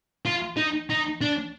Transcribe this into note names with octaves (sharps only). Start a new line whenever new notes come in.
F4
D#4
D#4
D4